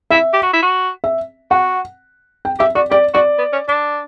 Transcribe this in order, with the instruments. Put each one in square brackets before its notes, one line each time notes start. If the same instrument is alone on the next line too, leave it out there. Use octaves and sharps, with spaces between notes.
[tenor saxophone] E4 [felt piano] E5
[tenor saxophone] G4
F#4
E4
F#4
[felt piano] E5
[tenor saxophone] F#4 [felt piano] F#5
[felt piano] G5
[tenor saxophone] G4 [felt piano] E5
[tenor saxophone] F#4 [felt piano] D5
[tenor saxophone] G4 [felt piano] D5
[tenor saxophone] F#4 [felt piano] D5
[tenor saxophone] B3
C#4
D4